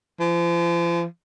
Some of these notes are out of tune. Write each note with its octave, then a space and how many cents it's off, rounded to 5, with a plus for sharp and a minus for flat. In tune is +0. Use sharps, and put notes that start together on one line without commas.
F3 -40